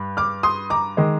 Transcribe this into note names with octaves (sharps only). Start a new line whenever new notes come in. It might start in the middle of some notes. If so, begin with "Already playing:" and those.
Already playing: G2
D6 F6
C6 D#6
A#5 D6
D#3 G#3